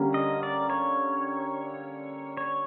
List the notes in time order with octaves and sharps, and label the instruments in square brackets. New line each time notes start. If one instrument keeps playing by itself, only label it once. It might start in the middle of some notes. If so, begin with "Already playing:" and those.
Already playing: [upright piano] D3 G3 A#3 C#4
[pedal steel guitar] D#5
D5
C#5
C#5